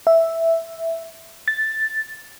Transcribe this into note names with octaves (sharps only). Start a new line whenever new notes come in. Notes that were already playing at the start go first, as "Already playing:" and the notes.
E5
A6